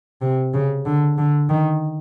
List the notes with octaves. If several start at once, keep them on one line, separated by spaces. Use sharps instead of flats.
C3
C#3
D3
D3
D#3